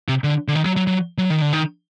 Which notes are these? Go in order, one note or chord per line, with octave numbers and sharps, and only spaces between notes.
C3
D3
D3
D#3
F#3
F#3
F#3
F#3
D#3
D3
D#3